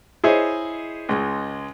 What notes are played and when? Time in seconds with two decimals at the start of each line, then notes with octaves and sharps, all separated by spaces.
0.24 E4 G#4 C5 C#5 D#5
1.09 C#2 G#3